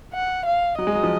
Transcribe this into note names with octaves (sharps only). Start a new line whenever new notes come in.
F#5
F5
F#3 D#5
G#3
F#3
F3